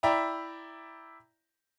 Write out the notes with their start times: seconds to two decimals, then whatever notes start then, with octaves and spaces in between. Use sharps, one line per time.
0.03 E4 D5 E5 G5 A#5 B5